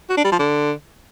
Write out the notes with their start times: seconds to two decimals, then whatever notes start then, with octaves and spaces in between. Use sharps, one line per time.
0.10 F#4
0.17 D4
0.25 G3
0.32 F3
0.39 D3